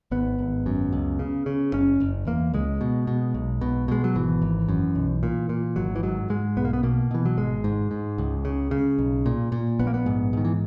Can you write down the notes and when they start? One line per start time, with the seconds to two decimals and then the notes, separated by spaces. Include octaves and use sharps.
0.11 G#1 B3
0.39 G#1
0.66 F#2
0.93 C#2
1.19 C#3
1.46 C#3
1.73 F#1 C#4
2.00 F#1
2.27 E2 A#3
2.54 C#2 G#3
2.81 B2
3.07 B2
3.34 B1
3.61 B2
3.88 B2 G#3
4.04 F#3
4.15 G#1 E3
4.42 G#1
4.69 F#2
4.95 B1
5.23 A#2
5.49 A#2
5.76 G#1 F#3
5.96 E3
6.03 G#2 F#3
6.30 G#2 G#3
6.57 B1 B3
6.65 A#3
6.73 B3
6.83 B2 A#3
7.11 B2 E3
7.26 F#3
7.37 G#1 G#3
7.64 G#2
7.91 G#2
8.18 C#2
8.45 C#3
8.71 C#3
8.98 B1
9.26 A#2
9.52 A#2
9.79 A#1 B3
9.87 A#3
9.94 B3
10.06 G#2
10.33 G#2 D#3
10.45 E3